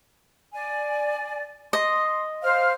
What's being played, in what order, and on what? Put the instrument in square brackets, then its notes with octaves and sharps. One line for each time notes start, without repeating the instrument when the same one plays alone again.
[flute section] D5 G#5
[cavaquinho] D#5 [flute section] C6
[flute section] C5 F5 F6